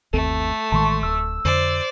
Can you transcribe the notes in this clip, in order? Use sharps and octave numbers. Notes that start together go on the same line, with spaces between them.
G1 D#2 A3 C4 A4
A1 D#3 G#3 A5 C6 C#6
D1 E6
F2 D3 C5 D5